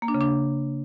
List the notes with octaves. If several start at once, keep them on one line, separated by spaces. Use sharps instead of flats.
A#3
D4
C#3
D4